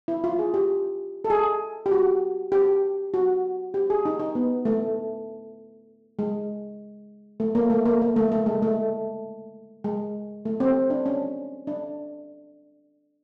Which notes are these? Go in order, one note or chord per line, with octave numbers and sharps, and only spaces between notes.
E4
F4
G#4
G4
A4
G#4
G4
F#4
G4
F#4
G4
G#4
D#4
D#4
B3
A3
G#3
A3
A#3
A3
A#3
A#3
A3
A3
G#3
A3
G#3
A3
C4
D4
C#4
D4